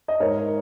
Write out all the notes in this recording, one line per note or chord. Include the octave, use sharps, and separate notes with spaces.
D#5
G#2 A#4 C#5